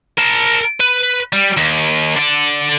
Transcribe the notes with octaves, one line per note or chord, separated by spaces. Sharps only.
A#4 A5
B4
G3
D#2
D3 D5